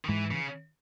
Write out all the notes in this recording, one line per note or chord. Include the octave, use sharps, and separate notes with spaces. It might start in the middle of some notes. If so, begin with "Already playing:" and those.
D#3
G#2 E3 G#3
C#3 E3